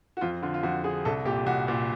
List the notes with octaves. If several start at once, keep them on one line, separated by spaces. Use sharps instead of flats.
F#4
F2 F4
D3 F4
F4
F2 F#4
D3 G#4
C2 A4
A#2 G4
C2 F#4
A#2